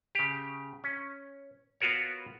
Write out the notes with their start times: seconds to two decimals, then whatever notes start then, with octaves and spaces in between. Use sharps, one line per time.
0.15 C#3 G4
0.84 C#4
1.80 B3 F4 F#4 A#4 C#5